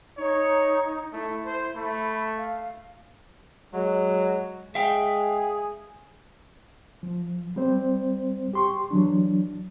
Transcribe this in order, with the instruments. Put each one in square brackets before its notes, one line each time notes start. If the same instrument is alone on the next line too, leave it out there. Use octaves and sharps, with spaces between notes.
[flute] D#4 [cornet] C#5
[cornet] A3 [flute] E4
[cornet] C5
[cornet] A3 [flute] B5
[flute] F5
[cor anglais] F#3 [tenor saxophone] G#3
[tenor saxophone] G#3 [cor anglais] G#4 [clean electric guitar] E5 F5 G5
[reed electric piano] F3
G3 C4 C5
G4 C6 C#6
E3 F#3 D4